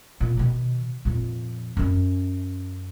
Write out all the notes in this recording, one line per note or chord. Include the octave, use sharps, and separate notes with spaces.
A#2
B2 D#3
F2 A#2
F#2 C#4